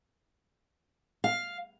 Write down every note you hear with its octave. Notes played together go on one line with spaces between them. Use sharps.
F5